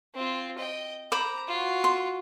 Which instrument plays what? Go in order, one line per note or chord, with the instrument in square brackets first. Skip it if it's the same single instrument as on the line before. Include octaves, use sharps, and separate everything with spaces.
[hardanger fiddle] C4 F4
D#5 G5
[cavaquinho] C5 B5 D6 [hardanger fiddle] A#5
[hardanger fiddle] F4 F#4
[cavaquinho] C6